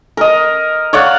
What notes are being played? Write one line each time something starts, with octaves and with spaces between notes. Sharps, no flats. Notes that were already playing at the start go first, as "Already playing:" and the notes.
A#4 D#5
C#5 D5 F5 F#5